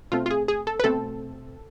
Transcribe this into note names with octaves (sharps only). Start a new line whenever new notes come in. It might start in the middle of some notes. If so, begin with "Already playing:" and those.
B2 A3 C4 F4
F4
G#4
G#4
A4
B4
B2 A3 C4 A4